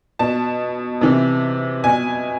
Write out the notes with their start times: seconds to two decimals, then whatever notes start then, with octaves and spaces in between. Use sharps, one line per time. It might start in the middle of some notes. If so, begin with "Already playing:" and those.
0.19 B2 A5
1.01 C3 E3
1.84 B2 G#5